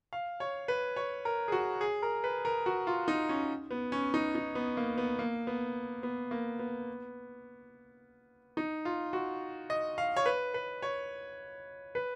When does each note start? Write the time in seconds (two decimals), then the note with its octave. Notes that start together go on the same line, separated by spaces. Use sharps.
0.13 F5
0.40 C#5
0.68 B4
0.96 C#5
1.25 A#4
1.48 G#4
1.52 F#4
1.81 G#4
2.02 A#4
2.24 B4
2.45 A#4
2.66 F#4
2.87 F4
3.08 D#4
3.29 C#4
3.71 B3
3.92 C#4
4.14 D#4
4.35 D#4
4.55 B3
4.77 A#3
4.98 B3
5.19 A#3
5.47 B3
6.03 B3
6.31 A#3
6.59 B3
8.57 D#4
8.85 F4
9.13 F#4
9.70 D#5
9.98 F5
10.17 C#5
10.26 B4
10.54 B4
10.82 C#5
11.95 B4